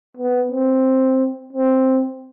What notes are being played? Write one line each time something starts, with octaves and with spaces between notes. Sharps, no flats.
B3
C4
C4